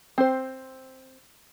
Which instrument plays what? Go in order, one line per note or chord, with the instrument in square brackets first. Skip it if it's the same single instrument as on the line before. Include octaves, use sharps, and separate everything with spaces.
[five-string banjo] C4 C5